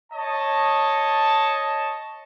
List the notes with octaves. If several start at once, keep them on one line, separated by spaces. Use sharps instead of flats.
C#5 D#5 A5